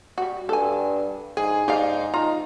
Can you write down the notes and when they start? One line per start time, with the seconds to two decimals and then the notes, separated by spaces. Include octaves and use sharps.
0.18 G3 F#4
0.49 G2 A4 G#5
1.37 G#2 G#4 G#5
1.68 G#2 D#4 G4 D5 F5
2.14 F3 D#4 F4 A#5